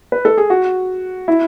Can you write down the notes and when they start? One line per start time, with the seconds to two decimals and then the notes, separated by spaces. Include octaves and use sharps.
0.12 B4
0.25 A4
0.38 G#4
0.50 F#4
1.28 E4